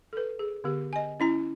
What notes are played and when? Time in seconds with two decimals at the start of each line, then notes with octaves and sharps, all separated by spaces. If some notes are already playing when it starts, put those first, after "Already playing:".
0.13 A4 B4
0.39 G#4
0.64 D3 B3 G4
0.93 D#5 G#5
1.20 C#4 E4 A#5